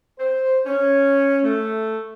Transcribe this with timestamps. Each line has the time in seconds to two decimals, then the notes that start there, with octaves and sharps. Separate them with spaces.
0.19 C5
0.66 C#4
1.44 A3